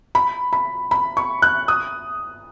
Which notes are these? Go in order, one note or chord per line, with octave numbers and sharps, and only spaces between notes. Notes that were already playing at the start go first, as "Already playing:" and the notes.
B5
B5
B5
C#6
F#6
D#6